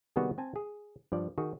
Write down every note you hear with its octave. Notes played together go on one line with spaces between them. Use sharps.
C3 D#3 G3 B3 F#4 G#4
C4 G#5 A5
G#4
G2 F3 D5
D#3 F#4 G#4